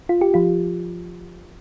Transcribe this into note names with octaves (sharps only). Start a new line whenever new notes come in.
F4
G4
F3 F4